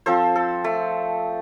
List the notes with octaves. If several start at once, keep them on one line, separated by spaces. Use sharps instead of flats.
F3 C4 A4 C5
A4
A3